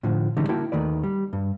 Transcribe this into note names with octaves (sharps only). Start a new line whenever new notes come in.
A2 D3 F3
D3 E3 G3 G#3 C#4 D#4
A#3 E4 F#4 A#4 G5 A5
D#2 D#3 A3 B4 D5
G3
G2